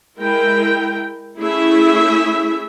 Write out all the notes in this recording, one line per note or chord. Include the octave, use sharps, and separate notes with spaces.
G#3 E4 A#4 G5
A3 C#4 E4 G#4 E5